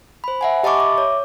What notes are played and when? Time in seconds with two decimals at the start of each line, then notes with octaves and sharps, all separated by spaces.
0.24 C5 B5
0.41 E5 F#5 G#5
0.63 G4 D#5 A5 B5 C#6 D6
0.78 E5 D6
0.98 C#5